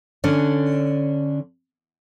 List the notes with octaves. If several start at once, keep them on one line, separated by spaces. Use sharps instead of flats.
D3 C#4 D4